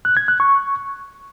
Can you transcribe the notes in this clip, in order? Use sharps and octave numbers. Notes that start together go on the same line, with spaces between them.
F#6
G#6
F#6
C#6